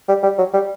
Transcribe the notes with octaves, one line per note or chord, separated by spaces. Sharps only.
G3
G3
F#3
G3